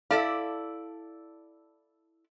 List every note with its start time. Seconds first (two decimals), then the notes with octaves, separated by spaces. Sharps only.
0.11 E4 A4 D5 F5